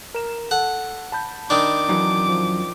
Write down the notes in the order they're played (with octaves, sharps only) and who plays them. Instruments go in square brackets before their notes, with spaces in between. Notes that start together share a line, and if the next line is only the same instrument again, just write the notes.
[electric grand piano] A#4 E7
[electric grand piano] A4 [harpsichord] F#5
[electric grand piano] A5 B5 G6
[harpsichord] D#3 D4 [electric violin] D6
[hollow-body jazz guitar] F#2 E3
[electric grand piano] F3